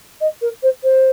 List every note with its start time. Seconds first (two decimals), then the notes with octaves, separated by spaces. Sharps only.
0.21 D#5
0.41 A#4
0.63 C5
0.83 C5